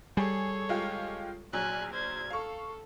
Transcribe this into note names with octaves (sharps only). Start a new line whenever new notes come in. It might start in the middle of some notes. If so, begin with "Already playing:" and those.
G3 G#4 A4 C#5
G#3 F4 G4
A#1 F#3 G#5 F#6
C5 G#6
A4 F5 C#6